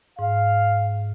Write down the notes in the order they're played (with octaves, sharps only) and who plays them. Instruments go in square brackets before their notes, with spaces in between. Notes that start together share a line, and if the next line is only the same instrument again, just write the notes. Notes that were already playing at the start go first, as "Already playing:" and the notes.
[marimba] G#2 [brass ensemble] F5